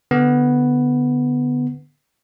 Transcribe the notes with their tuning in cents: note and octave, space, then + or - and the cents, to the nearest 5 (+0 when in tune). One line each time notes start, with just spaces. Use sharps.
D3 +0 B3 +0